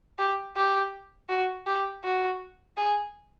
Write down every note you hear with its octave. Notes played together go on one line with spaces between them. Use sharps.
G4
G4
F#4
G4
F#4
G#4